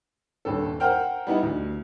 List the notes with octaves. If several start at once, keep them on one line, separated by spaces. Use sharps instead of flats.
D#1 G2 A4
A#4 C5 F#5 G5 F6
G3 B3 D#4 E4
D2